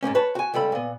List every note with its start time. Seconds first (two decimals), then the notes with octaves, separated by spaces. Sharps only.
0.03 G#2 B2 A#3 C#4
0.15 B4 C#5 A5
0.35 F#4 G#5
0.54 C#2 G3 A4 B5
0.72 A#2 B3